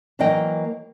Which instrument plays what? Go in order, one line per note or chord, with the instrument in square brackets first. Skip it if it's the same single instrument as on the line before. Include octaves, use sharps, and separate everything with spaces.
[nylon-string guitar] E3 F#3 A#3 A#4 D#5 G5